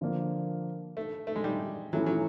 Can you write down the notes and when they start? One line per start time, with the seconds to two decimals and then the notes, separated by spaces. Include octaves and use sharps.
0.01 D3 F3 A#3 D4
0.97 A3
1.27 A3
1.36 G#3
1.44 G3
1.93 E3 F#3 A3 C#4 E4
2.06 F#3